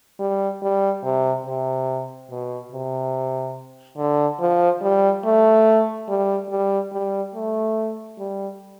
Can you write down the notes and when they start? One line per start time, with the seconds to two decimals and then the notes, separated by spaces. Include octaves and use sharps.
0.19 G3
0.62 G3
1.03 C3
1.46 C3
2.30 B2
2.72 C3
3.98 D3
4.40 F3
4.82 G3
5.24 A3
6.09 G3
6.50 G3
6.92 G3
7.35 A3
8.19 G3